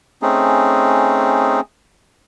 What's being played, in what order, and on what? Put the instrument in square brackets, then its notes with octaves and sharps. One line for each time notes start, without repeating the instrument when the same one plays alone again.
[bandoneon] A3 C4 C#4 D#4 G#4